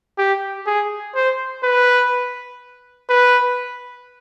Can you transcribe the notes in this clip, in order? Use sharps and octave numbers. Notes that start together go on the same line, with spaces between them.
G4
G#4
C5
B4
B4